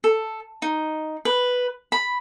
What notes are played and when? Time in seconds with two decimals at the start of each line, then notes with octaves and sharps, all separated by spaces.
0.04 A4
0.62 D#4
1.25 B4
1.92 B5